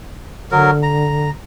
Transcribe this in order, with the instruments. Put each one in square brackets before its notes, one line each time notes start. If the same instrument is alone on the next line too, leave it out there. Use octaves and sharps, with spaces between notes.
[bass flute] D3 [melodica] F#3 A#4
[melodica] A#5